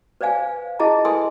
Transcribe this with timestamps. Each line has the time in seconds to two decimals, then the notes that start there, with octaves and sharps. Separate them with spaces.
0.21 B4 C5 D5 F5 G#5
0.79 E4 G#4 D#5 A5 A#5
1.05 A4 B4 E5 G#5 C6 D#6